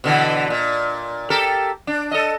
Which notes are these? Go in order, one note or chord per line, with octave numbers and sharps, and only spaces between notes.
B2 D3 E3
A#2
G4 A4 A#4
D4
A4 D#5